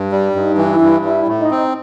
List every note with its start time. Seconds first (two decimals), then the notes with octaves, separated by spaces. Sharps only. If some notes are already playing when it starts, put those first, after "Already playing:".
Already playing: G2
0.12 G3
0.35 G2 D#4
0.58 E3
0.70 E4
0.82 G2
1.04 G3 E4
1.28 A2
1.40 D#4
1.51 C4